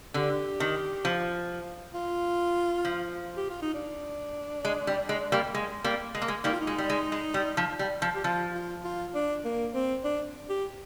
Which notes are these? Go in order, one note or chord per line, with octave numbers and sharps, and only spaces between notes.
D3 G4
D#3
F3
F4
F3
G4
F4
D#4
D4
G#3
G3
G#3
G3 A#3
G#3
G3 A#3
G#3
A#3
G#3
G3 A#3 D#4
F4
D#4
G#3
G3
G#3
G#3
G3
F3
G3
F3
G4
F3 F4
F4
F4
D4
A#3
C4
D4
G4